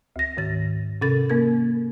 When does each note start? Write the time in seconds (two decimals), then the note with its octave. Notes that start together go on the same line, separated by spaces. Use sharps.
0.16 D2 A#6
0.37 G#2 D#3 A6
1.01 C3 C#4 A4 A6
1.30 A#3 A#4 G#6